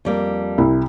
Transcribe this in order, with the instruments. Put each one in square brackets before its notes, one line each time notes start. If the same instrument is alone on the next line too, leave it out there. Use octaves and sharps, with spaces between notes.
[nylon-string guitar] F2 G3 A#3
[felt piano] C2 E4